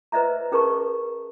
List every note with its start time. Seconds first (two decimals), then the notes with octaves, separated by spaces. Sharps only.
0.12 B4 C5 D#5 E5 A#5
0.52 C#4 G#4 A#4 B4 A5 C#6